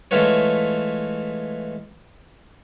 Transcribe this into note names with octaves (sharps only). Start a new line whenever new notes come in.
E3 G#3 A3 F4 B4 C#5